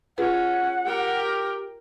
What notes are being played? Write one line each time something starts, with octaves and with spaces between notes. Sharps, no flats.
C#4 F4 G#4 B4 F#5
G4 A#4 G5